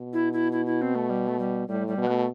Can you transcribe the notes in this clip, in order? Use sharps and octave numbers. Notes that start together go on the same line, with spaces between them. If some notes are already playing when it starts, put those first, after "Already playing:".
Already playing: B2
E4
E4
E4
E4
C4
A3
G3
A3
G3
A2 G3
G3
B2
B3
A3